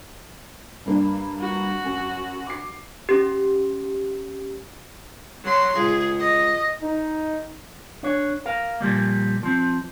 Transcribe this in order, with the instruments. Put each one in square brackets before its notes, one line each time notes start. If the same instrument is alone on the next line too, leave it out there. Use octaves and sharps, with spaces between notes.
[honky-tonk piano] G2 A#3 D4
[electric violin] F#4
[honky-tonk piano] F#2
D6 C7
[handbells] C#4 G4
[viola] F#3 C6
[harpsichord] C#2 [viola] G#4
[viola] D#5
[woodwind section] D#4
[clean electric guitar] D4 C#5
A#4 F5
A#2 F3 G3 A#3
F3 C4